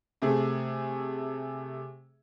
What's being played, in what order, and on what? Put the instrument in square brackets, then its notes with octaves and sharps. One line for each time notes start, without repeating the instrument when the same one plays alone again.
[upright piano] C3 A3 G#4